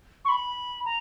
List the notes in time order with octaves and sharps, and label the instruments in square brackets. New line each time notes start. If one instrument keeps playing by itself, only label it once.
[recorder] C#6
B5
A#5